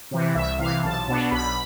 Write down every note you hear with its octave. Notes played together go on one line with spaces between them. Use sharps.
C3 E3
C2 E5
C3 E3 F5
B1 A5
B2 B3 D4
B1 B5